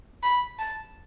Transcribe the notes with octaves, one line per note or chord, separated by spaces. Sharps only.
B5
A5